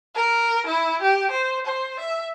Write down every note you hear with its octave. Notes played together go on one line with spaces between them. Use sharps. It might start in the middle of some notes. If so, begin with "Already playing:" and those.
A#4
E4
G4
C5
C5
E5